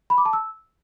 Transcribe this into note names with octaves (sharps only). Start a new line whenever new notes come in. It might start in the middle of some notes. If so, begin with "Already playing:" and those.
B5
D6
A5
E6